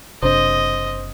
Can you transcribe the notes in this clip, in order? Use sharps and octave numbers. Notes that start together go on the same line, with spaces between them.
F#1 C3 D4 C5 D#5